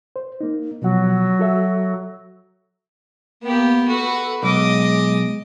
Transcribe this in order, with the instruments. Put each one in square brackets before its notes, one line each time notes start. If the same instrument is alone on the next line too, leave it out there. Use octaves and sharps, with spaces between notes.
[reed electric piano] C5
A#3 D#4
[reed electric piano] B2 F3 F#5 [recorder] F#3
[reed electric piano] F#4 A4 E5
[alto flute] A#3 [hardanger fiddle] B3 G4
[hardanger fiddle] F#4 B4 [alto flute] A4
[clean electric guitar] B1 [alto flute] G#3 [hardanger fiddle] D#5 D6